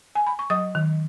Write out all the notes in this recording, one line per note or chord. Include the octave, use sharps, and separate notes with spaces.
G#5
B5
C#6
F#3 D#5 D#6
D#3